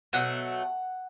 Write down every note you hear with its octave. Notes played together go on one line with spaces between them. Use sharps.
B2 F#3 A3 F#5